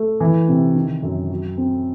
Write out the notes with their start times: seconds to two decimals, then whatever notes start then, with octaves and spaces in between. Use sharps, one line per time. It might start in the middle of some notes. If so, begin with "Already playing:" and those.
Already playing: A3
0.20 E3
0.49 C3
0.76 D#3
1.03 F#2
1.30 F#3
1.57 C4